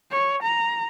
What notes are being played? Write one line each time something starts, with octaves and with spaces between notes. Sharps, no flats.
C#5
A#5